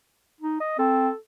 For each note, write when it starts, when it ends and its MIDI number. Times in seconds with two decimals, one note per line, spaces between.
0.40 0.59 63
0.60 0.76 75
0.79 1.08 60
0.79 1.16 69